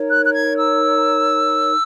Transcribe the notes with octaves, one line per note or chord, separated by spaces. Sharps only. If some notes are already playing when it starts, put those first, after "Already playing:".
Already playing: D#4 A#4 C#5
F#6
F#6
G#6
E6